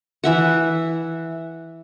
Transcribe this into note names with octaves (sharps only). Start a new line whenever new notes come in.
E3 E5 F#5